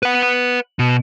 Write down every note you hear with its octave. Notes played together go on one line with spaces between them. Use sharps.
B4 F#5
B2